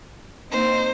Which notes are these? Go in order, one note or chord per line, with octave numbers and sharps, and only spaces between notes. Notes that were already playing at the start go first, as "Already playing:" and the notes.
A#3 C4 D#4 C5